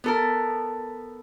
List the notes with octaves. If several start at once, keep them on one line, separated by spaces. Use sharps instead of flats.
B3 A4 A#4